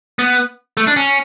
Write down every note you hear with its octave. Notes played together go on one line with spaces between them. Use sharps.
B3
A3
D4
C#4